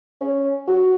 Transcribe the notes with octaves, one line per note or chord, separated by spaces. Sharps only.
C#4
F#4